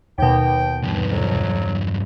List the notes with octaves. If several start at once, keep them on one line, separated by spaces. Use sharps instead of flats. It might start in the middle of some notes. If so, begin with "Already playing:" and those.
D#2 B2 G5
E2 G2
F2 F#3